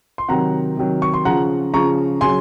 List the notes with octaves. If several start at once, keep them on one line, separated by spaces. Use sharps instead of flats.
C6
C3 D#3 F#3 F#5 A#5
C3 D#3 F#3
C#6
C6
C#3 F3 F#5 A#5
C#3 F3 A#5 C#6
C#3 F#3 G#5 C6